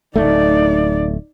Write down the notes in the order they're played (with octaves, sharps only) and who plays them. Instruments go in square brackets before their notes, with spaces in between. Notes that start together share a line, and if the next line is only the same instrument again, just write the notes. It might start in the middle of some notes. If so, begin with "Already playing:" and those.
[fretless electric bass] D1 G#1 A3 [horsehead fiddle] D#4 D5